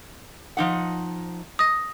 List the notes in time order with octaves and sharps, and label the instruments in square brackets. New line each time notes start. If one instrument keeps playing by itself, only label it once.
[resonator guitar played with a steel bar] F3 D#4 F#5
[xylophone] D#6 A#6